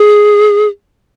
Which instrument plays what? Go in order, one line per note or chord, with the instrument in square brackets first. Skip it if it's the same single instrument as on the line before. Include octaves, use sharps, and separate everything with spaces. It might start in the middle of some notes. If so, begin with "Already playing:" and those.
Already playing: [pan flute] G#4